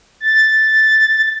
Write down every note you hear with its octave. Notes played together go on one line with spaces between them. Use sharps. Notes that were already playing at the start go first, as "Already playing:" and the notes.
A6